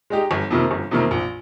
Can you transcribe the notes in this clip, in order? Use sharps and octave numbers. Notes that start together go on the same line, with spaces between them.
G#3 D#4 G4
G1
F2 C3 D#3 A#3
G1
F2 C3 D#3 A#3
A#1